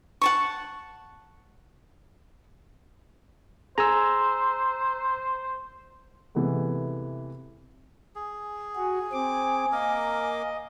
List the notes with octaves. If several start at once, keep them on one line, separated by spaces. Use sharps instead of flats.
F#5 A5 C#6
G#4 C5 A#5 E6
C3 E3 G#3 A3 B3
G#4
F#4 G#5
C4 D6
A#3 A#4 D#5 D6